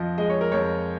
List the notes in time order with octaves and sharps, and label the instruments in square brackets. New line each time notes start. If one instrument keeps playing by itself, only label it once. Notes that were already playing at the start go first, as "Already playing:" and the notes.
Already playing: [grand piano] F2 F3 D#5
G#3 D#5
C#5
A#4
F2 C#5